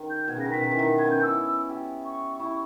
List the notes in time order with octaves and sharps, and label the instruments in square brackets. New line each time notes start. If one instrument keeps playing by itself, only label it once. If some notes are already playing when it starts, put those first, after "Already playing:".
Already playing: [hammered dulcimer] D#3
[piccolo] G6
[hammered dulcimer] B2 [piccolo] G#6
[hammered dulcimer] C#3 [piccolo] A#6
[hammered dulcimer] D#3
[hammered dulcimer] B2 [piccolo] B6
[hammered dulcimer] D#3
E3
D#3
[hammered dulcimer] B3 [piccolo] G#6
[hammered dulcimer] C#4 [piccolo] G6
[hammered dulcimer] D#4
[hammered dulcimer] E4 [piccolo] E6
[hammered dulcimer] G4
[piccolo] C#6
[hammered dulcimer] E4